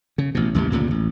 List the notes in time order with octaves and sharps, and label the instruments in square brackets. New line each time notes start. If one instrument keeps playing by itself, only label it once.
[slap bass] C#3
A1 B2
A1 D#2 C#3 G3
D2 G2 A#2 C#3
A1